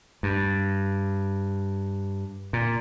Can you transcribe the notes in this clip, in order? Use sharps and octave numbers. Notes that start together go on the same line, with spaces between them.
G2
A#2